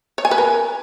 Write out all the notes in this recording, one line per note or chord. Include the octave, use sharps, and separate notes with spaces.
C#5
G#5
B4
A#4